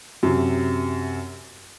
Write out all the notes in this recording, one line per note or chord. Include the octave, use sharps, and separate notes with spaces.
F#2 C3